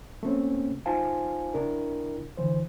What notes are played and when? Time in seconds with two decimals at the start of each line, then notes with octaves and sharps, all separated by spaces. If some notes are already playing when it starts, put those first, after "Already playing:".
0.23 A3 A#3 C4 C#4
0.86 D#4 F4 C5 F5 G#5 A5
1.54 D4 E4 A#4
2.38 D3 E3 C5